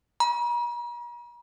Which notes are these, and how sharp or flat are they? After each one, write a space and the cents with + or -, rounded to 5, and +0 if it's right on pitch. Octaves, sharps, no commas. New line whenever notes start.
A#5 +45